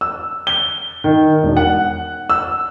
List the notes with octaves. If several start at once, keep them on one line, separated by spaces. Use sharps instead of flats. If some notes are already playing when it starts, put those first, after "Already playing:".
E6
G7
D#3
E1
F#5
E6